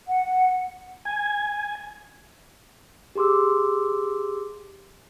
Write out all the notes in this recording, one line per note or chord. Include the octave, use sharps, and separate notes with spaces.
F#5
G#5
G4 G#4 C6 D6 E6